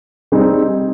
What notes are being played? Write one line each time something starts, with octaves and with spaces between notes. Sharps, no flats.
G3 C4 D#4 G#4